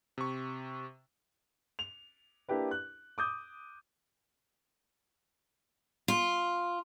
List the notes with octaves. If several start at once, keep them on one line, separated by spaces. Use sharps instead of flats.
C3 C#6
F7
A#3 D4 E4 G4 B4
F#6
D6 D#6 G6
F4